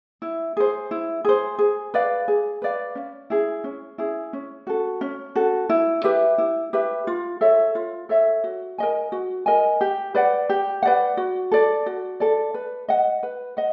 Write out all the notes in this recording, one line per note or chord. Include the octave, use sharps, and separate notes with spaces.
E4
G#4 C5
E4
G#4 C5
G#4
B4 D5 F5
G#4
B4 D5 F5
C#4
E4 G#4
C#4
E4 G#4
C#4
F#4 A4
C#4
F#4 A4
E4
G4 B4 E5
E4
G4 B4 E5
F4
A4 C#5 E5
F4
A4 C#5 E5
F#4
A#4 D#5 G#5
F#4
A#4 D#5 G#5
G4
B4 D5 F#5
G4
B4 D5 F#5
F#4
A4 D5
F#4
A4 D5
B4
D#5 F#5
B4
D#5 F#5